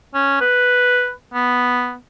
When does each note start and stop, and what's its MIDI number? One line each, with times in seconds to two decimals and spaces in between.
0.15 0.38 61
0.41 1.12 71
1.34 1.95 59